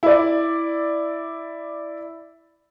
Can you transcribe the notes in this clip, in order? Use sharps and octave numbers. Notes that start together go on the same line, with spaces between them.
E4 D5